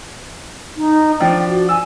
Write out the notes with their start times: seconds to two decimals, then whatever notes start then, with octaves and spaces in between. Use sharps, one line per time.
0.77 D#4
1.20 F3 D4 G5
1.47 F#4
1.69 G#5 E6